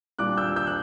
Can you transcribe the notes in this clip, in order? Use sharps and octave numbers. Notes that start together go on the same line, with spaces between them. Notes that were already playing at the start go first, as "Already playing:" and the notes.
A#2 G3 A#3 D4 D6 F#6
E6 G6
E6 G6
F#6